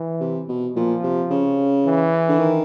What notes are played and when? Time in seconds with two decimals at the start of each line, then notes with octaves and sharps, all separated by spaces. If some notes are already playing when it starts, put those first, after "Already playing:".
Already playing: E3
0.21 C3
0.48 B2
0.75 A#2 F3
1.03 C3
1.30 C#3
1.85 E3
2.28 D3
2.39 D#3